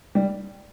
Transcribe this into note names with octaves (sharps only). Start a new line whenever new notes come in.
G3